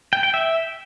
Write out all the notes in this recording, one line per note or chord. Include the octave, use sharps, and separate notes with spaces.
G5
G5
E5